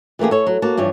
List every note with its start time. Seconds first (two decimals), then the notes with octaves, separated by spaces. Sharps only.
0.19 E3 A3 A#3 G4 G#4
0.31 A4 C#5
0.47 F#3
0.62 A#3 F#4 A5
0.77 G2 E3 F3 C#5